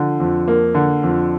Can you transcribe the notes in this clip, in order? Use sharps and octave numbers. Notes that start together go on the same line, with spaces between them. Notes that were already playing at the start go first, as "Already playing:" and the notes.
Already playing: D3 F3
F2
A#3
D3
F2